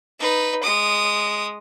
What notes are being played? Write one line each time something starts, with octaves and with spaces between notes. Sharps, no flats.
D#4 B4
G#3 D#6